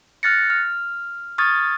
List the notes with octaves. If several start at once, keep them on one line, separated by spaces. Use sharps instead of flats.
F6 F#6 A6 A#6 C#7
F6
C#6 D#6 F6 G#6 A6